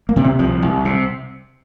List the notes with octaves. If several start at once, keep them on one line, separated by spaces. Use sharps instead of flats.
A#3
C3
C4
C2 F3
C2
C3